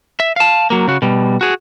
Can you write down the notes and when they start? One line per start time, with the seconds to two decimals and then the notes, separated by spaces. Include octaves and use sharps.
0.20 E5
0.36 F5 A5
0.70 F#3 A#3
0.88 C#3 F#4
1.02 B2 G3
1.41 F#4 G#4